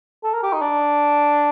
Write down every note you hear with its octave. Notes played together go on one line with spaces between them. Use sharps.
A4
A#4
G4
D#4
D4